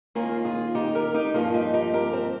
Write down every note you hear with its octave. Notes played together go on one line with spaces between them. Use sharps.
D#2 D#3 A#3 F4 G#4
F4 G#4
D#4 G4
G4 A#4
D#4 G4
G2 F3 A#3 F4 G#4
D#4 G4
D#4 G4
G4 A#4
C4